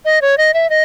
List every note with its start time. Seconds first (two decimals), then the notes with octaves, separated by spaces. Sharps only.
0.05 D#5
0.22 C#5
0.38 D#5
0.54 E5
0.70 D#5